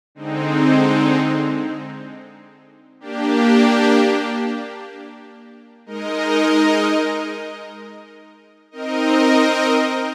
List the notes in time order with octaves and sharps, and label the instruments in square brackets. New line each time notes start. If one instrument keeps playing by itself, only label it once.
[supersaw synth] D3 G#3 C4 D#4
A#3 D4 G4
G#3 D#4 A#4 D#5
C4 D#4 A#4 D#5